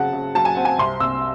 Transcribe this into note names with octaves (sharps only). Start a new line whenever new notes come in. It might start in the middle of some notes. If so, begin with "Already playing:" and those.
Already playing: C#3 F#3 C4 F#5 A5
C#3
F#3 A5
G#5
C4 F#5
G#5
C2 C6
C2 E6